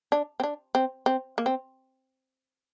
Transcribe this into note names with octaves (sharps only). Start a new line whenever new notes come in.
D4
C4
D4
C4
C4
A#3
C4